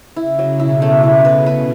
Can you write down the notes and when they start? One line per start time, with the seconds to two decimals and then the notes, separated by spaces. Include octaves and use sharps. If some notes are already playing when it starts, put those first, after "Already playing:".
0.16 C#3 E4
0.39 F#3
0.60 B2 E4
0.82 A3
1.03 C#3 E4
1.25 B4
1.46 B4